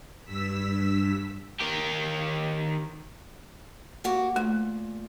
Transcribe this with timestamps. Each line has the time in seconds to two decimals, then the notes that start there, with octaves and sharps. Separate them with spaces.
0.25 G2 E6 B6
1.60 D#3 G4
4.04 A#3 F#4 G4
4.36 A#2 A3